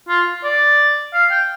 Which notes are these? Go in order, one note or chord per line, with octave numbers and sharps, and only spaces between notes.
F4
D5
F5
G5